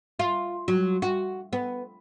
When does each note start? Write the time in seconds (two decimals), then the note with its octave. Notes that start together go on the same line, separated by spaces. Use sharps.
0.19 F4
0.68 F#3
1.02 F#4
1.53 B3